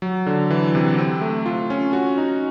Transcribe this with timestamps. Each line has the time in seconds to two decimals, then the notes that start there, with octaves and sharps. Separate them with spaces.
0.02 F#3
0.26 D3
0.51 E3
0.75 C3
0.98 C4
1.21 A3
1.46 F4
1.70 C#4
1.93 F#4
2.18 D#4